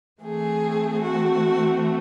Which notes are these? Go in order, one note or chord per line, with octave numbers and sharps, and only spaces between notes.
E3 A3 C4 G#4
F#4